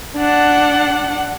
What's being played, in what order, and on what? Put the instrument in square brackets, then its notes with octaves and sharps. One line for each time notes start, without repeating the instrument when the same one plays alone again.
[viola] D4 F#5